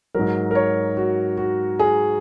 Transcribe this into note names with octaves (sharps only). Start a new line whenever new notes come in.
G#2 F#3 A#4
A#4
C#5
F#4
F#4
G#4